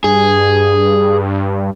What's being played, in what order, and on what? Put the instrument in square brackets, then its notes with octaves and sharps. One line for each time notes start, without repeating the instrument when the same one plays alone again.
[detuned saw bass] G2 [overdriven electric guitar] G#4